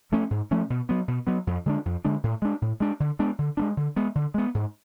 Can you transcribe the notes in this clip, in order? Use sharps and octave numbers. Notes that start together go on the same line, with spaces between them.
F3 A3 C#4
G#2
F3 A3 C#4
B2
F#3 B3
B2
F#3 B3
F2
D3 G#3 D4
F2
D3 G#3 D4
A2
G#3 D4
A2
G#3 D4
D3
G#3 B3 D4
D3
G#3 B3 D4
D3
G#3 B3
D3
G#3 B3
G#2